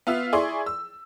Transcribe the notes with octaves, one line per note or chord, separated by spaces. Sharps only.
B3 F4 E5
E4 G#4 D5 C6 C#6
E6